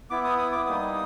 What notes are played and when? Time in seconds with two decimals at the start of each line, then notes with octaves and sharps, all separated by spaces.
0.10 B3 E4 D6
0.25 D#6
0.38 D#6
0.52 D6
0.66 G3 A#3 D#4 D#6